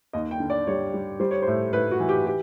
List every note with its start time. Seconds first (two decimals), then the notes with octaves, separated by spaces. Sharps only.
0.13 D#2 D#5
0.31 G5
0.40 D3
0.50 D5
0.67 G3 C#5
0.94 G3
1.20 G3 C5
1.31 C#5
1.42 C5
1.47 A2
1.73 A2 B4
1.91 F#4
2.00 E3
2.09 G4
2.27 G4